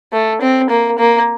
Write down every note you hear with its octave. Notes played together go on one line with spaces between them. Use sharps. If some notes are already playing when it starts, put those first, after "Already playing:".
A3
C4
A#3
A#3